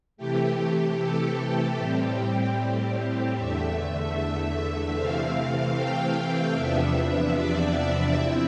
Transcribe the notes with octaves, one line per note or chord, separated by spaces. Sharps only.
C3 E3 A3 G4
A4
A2 G3 C4 G4
G4
E2 D3 A3 E5
E5
C3 E3 A3 C4 F5
G5
F5
E2 C3 F3 B3 D4 E5
D5
C3 F3 C4 E4 E5